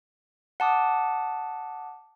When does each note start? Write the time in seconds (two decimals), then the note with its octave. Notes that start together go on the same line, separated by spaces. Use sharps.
0.60 F#5 A5 D6 D#6